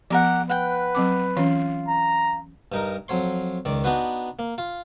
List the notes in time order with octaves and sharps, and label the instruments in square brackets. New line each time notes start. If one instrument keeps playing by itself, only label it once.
[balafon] F3 B3 [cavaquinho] G4 A#4 F#5
[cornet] B4 [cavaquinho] F#5 G5
[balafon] F#3 C4 D6
[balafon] E3 C#4 [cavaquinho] F4
[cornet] A#5
[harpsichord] G2 D#4 A#4
F2 F#3 C#5 C6
C#2 D#3 D5
B3 D4 D#4 F#4 B4
A#3
F4